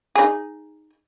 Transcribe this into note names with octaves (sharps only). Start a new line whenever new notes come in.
D#4 G#4